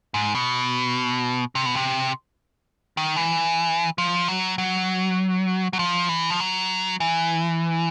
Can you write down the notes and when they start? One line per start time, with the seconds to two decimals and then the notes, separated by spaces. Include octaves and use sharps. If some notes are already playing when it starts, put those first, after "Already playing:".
0.14 G#2
0.35 B2
1.55 C3
1.66 B2
1.75 C3
2.97 D#3
3.16 E3
3.98 F3
4.28 F#3
4.58 F#3
5.73 F#3
5.79 F3
6.09 E3
6.31 F3
6.40 F#3
7.00 E3